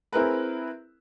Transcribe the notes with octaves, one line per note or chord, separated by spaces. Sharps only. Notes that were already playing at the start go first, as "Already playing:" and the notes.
C4 E4 G#4 A#4 B4